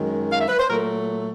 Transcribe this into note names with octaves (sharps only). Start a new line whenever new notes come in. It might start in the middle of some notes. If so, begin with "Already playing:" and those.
Already playing: F#2 D#3 G#3
F5
E5
B4
C5
A#2 F#3 A3 A#4